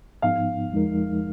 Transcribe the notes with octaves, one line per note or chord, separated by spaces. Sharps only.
G#2 F3 B3 D#4 F5
F2 F3 G#3 D#4 A#4